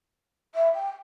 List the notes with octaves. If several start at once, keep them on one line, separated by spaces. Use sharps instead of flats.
E5
G5